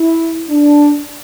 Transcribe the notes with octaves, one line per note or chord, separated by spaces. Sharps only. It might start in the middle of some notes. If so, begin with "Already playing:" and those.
Already playing: E4
D4